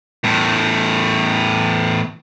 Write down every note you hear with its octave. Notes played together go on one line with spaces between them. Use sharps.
E2 A2